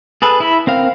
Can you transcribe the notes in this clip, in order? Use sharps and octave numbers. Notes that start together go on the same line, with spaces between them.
G#4 A4 B4
E4 B5
C4 A#4 F5